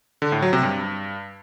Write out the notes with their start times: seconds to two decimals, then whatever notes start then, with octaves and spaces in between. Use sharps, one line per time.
0.22 D3
0.32 A2
0.42 F#3
0.53 C3
0.63 G2